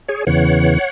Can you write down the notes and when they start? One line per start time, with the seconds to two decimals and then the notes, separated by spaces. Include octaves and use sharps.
0.09 G#4 C#5
0.27 E2 C#3 E3 C#5 F#5